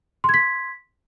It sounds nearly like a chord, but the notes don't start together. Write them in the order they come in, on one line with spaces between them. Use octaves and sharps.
C6 G#6 B6